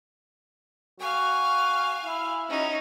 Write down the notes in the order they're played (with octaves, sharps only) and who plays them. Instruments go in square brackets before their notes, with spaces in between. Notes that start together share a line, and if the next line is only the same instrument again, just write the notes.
[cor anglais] F#4 [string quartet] F5 G#5
[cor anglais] E4
[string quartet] C#4 D#4 F#4